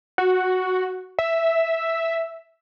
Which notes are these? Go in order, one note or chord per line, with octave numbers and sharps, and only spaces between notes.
F#4
E5